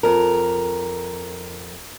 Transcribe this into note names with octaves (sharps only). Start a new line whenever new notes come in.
F2 A#4